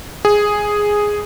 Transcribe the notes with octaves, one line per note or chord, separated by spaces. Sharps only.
G#4